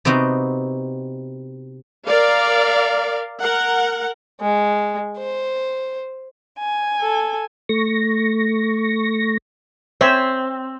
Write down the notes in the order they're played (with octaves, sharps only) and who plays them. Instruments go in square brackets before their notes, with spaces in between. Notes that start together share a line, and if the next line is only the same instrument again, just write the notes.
[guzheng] C3 B3 C4 D#4 F#4
[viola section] A#4 D5 F5
A#4 F#5
[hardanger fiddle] G#3
C5
[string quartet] G#5
[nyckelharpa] A4
[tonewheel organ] A3 C#6 A#6
[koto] C4 [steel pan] C5 C#5 E5